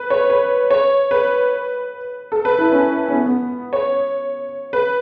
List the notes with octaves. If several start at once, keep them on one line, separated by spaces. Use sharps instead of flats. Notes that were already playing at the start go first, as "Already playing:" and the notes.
Already playing: B4
C#5
B4
C#5
B4
A4
B4
E4
C#4
C#4
B3
B3
C#5
B4